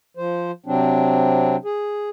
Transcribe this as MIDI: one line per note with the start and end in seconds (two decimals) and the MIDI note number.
0.17 0.51 53
0.17 0.51 72
0.66 1.56 48
0.66 1.56 54
0.66 1.56 60
0.66 1.56 62
1.65 2.09 68